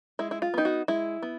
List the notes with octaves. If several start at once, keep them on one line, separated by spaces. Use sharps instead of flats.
G#3 E4
E4
F4
B3 D#4 G4
F#4
G#3 E4
B3